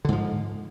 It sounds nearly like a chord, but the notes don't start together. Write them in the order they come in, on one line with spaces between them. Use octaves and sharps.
D3 G#2 F3